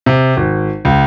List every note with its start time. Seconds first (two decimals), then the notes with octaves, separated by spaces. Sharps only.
0.06 C3
0.37 G#1
0.85 C#2